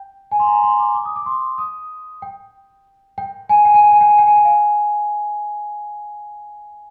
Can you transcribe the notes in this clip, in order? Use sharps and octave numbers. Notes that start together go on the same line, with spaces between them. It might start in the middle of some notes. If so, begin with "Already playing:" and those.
Already playing: G5
G#5
C6
A#5
C6
D6
D6
D#6
D6
C6
D#6
G5
G5
G#5
G5
G#5
G5
G#5
G5
G#5
G5
G#5
G5
F5